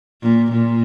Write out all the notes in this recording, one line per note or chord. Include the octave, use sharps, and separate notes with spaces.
A#2
A#2